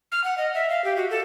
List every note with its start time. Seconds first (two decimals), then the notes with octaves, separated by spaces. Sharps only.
0.12 F6
0.24 F#5
0.38 D#5
0.54 E5
0.70 F5
0.85 G4
0.96 F#4
1.10 A4